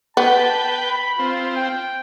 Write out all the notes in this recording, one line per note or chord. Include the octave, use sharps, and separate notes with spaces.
B3 B4 G5 A5
B5
C4 F4
G5